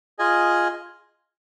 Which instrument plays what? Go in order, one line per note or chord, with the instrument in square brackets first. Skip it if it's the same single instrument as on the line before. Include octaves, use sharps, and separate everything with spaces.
[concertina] F4 G#4 D#5 G#5